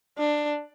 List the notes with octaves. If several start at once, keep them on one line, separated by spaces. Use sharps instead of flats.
D4